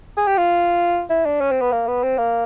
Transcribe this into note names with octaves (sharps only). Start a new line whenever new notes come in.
G#4
G4
F4
E4
D4
C#4
C4
B3
A#3
B3
C4
A#3